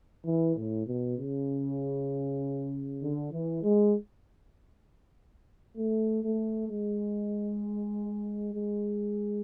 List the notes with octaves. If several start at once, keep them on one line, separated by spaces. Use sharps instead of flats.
E3
A2
B2
C#3
D3
E3
G#3
A3
A3
G#3
G#3